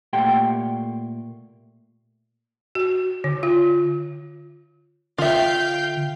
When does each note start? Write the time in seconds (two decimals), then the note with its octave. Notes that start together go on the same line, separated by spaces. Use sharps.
0.13 A#2 A3 G4 F#5 G5 C6
2.75 F#4
3.24 D3
3.43 F4
5.18 D3 F4 E5 F5 G5 G6